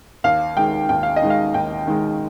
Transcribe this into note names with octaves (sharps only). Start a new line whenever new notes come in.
D#2 F5
D#3 G#3 G5
D#2 G5
F5
D#5
D#3 G#3
F5
D#2 G5
D#3 G#3